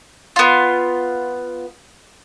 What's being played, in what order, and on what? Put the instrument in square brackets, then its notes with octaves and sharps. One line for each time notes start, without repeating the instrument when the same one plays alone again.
[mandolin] B3 F4